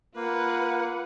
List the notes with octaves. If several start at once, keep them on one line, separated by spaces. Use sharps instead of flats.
A#3 F4 B4 F#5